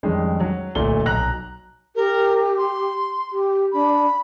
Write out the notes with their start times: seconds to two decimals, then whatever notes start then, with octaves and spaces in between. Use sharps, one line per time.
0.03 F2 D#3 G3 G#3 C#4
0.40 F#3
0.75 D1 A#2 A3 G7
1.06 B1 A#5 F#6 A#6
1.96 G4 A#4
2.58 C6
3.31 G4
3.72 D4 B5